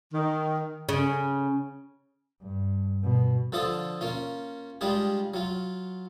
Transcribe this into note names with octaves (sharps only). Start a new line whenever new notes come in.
D#3
C#3
G2
B2
D3 F3 F4 A4 D#6
A#3 C#4 F4
G3 G#3 D4 F4 G#4
F#3 F4